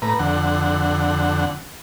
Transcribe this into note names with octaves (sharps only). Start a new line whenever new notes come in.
A2 B4 A#5
F2 D3 F#5